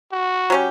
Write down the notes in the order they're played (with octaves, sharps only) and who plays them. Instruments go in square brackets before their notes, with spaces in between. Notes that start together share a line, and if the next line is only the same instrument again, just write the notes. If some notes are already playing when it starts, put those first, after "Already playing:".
[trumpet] F#4
[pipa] F#3 C#4 G4